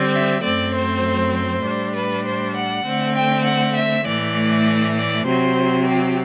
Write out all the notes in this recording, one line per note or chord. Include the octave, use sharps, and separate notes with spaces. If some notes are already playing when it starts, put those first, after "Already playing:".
Already playing: D3 G3 C4
E5
F#2 F#3 A3 C4 D5
C5
C5
A2 G3 D4
B4
C5
F#5
D3 A3 C4
G5
F#5
E5
A2 E3 A3 D5
D5
C3 F#3 C4 C5
G4